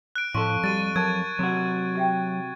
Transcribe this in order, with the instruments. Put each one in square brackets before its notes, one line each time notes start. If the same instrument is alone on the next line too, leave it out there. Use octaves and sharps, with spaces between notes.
[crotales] F#6 D7
[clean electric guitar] F2 A4 [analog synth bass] A2 [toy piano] C6 [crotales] C#6
[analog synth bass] G3 [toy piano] F#4 G4 [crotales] A6 D#7
[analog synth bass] F#3 [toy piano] A#4 A5 [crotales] G#6
[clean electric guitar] C3 F#4 [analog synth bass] F#3
[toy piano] G4 E5 G5